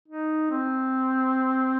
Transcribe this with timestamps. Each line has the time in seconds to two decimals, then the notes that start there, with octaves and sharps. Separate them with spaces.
0.08 D#4
0.50 C4